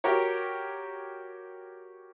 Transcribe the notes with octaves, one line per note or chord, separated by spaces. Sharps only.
F#4 G4 A#4 C#5